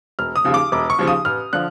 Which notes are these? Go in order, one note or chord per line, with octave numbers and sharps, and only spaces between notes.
E1 F6
D#6
D#2 C#3 F3
D6
E1 D6
C#6
D#2 C#3 F3
D#6
A1 F6
D3 F3 F#6